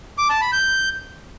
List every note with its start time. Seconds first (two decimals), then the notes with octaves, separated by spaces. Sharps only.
0.18 D6
0.30 A5
0.41 B5
0.53 G6